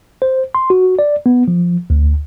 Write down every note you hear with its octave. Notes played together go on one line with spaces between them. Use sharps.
C5
C6
F#4
D5
B3
F3
D2